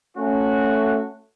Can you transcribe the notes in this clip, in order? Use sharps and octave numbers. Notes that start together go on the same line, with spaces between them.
A3 C#4 F#4